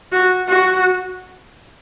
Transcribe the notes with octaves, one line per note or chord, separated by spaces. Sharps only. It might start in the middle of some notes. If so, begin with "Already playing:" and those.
F#4
F#4